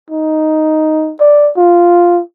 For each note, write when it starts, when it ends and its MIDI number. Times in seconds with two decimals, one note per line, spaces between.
0.10 1.13 63
1.20 1.51 74
1.57 2.21 65